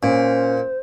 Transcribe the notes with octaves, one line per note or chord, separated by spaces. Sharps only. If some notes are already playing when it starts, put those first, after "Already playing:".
A#2 C#4 C5